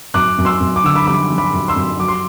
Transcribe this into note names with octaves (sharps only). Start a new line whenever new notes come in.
F#2 D6 F#6
F#2
C6 E6
F#2
D6
D3 E6
B5 D6
G3 B5 D6
G3
B5 D6
F#2
C6 E6
F#2
F#3 D6
C6